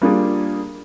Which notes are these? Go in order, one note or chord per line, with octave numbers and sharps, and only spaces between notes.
G3 A#3 D4 F4 G#4